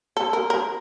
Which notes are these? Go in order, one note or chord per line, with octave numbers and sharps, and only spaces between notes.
A4
A#4
A#4